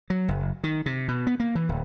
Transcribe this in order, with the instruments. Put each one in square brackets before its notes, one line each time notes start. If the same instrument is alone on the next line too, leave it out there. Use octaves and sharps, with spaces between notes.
[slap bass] F#3
F#1
D#3
C3
B2
B3
A#3
E3
D1